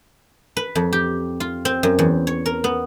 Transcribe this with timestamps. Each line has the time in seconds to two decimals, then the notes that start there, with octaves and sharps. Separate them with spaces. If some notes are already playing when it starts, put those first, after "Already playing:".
0.57 B4
0.75 F2
0.93 G4
1.40 F4
1.65 C4
1.83 F#2
1.99 E2
2.27 C#5
2.46 A#4
2.64 B3